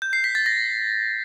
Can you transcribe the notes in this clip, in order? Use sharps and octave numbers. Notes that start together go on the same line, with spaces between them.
G6
C7
B6
A6
A#6